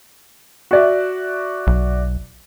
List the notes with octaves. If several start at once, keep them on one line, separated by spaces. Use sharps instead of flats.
F#4 D5 E5
B1